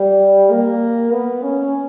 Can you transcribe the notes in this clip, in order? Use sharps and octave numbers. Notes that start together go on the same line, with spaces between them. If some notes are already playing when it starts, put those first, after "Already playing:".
Already playing: G3
A#3
B3
C#4